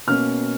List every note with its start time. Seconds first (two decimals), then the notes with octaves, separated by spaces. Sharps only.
0.07 B2 A#3 C#4 F6